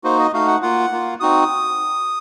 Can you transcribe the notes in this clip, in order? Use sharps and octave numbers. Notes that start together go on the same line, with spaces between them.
A#3 D#4 F#4 C5
D#5
A3 D#4 F#4 F5
F#5
A#3 F4 F#5
A#3 F4
C4 D#4 F#4 D#6